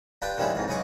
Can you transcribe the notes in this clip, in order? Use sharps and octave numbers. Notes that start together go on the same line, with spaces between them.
D4 F4 G4 B4 G5
D#3 F3 G3 G#3 C#4 E4
F2 G#2 E3
B1 C#3 G#3 G#4 C#6 D6